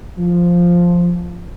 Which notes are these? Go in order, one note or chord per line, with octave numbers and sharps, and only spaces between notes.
F3